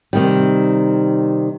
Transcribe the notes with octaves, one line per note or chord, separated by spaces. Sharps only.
C3 D#3 G3